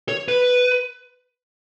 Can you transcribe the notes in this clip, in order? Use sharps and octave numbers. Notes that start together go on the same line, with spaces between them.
C#5
B4